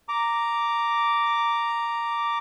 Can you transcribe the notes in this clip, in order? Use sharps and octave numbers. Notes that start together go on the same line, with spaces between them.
A#5 D6